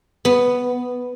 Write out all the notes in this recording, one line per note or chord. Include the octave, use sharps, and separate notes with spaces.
B3